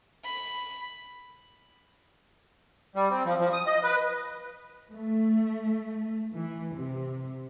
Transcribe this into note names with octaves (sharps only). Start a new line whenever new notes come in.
B5
G3
C4
F3
F3
D#6
D#5
B4
A3
E3
C3